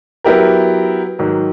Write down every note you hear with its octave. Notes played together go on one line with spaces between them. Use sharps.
F#3 B3 E4 G4 A#4
G#2 D#3 F#3